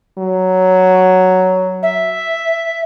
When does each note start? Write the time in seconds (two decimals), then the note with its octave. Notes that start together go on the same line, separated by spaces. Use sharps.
0.18 F#3
1.82 E5